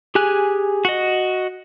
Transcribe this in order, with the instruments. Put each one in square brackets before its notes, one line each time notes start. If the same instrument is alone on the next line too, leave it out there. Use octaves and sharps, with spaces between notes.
[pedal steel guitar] G4 G#4 G#5 F#6
F#4 D#5